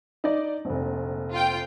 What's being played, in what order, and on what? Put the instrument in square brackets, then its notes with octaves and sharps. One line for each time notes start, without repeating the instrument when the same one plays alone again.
[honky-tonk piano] D#4 D5
F1 A#1
[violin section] F4 G5